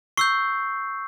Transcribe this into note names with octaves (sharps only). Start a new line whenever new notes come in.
C#6 E6 G6 C7